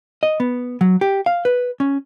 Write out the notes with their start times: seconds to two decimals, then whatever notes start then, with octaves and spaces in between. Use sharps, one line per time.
0.23 D#5
0.40 B3
0.81 F#3
1.01 G4
1.26 F5
1.45 B4
1.80 C#4